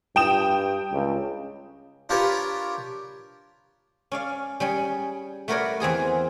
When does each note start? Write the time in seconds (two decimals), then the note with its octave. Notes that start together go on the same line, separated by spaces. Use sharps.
0.16 G2 G5 D#6 E7
0.92 C#2
2.09 D4 F4 G4 A#4 B4 C#5
4.12 C#4 D5 F5
4.60 G3 C#4 G#4
5.48 A3 F#4 A#4 B4 C#5 D5
5.80 E2 C4 G#4 D#5